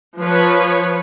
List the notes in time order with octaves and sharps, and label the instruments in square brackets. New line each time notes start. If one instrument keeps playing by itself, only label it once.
[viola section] F3 B4 C#5